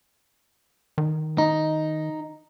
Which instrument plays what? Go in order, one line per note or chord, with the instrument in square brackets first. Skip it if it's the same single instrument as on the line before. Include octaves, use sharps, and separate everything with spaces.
[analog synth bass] D#3
[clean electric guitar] D#4